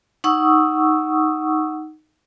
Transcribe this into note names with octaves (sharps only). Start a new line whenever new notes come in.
D#4 F#5 C#6 D#6 E6